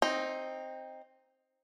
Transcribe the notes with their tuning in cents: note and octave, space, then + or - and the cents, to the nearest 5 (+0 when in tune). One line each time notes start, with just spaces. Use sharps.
C4 +10 D#4 +0